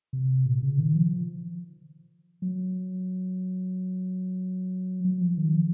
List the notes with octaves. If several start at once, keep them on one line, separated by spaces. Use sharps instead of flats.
C3
A#2
C#3
D#3
F3
F#3
F#3
F3
D#3
F3